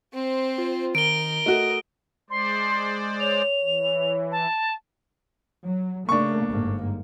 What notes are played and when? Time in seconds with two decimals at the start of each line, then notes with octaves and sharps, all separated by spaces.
0.13 C4 C5
0.58 F4
0.95 D#3 A#4 D7 G7
1.46 A3 F#4 D#5
2.30 G#3 C5 D5 C6
3.20 C#5 F7
3.63 E3
4.31 A5
5.66 F#3
6.09 C#3 A3 A#3 D4 C#6
6.48 G1 G#2 A#3